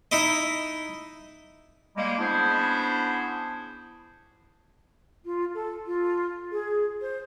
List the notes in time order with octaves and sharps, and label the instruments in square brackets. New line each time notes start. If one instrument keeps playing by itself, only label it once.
[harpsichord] D#4 E4 D#5
[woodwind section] G3 G#3 A#3
B3 C#4 D4 E4 G#4 C5
[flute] F4
A4
F4
G#4
C5